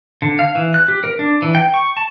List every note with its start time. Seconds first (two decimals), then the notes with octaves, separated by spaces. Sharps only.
0.22 D3
0.39 F5
0.55 E3
0.74 F#6
0.88 G4
1.04 A#4
1.19 D4
1.42 E3
1.55 G5
1.74 C#6
1.97 A5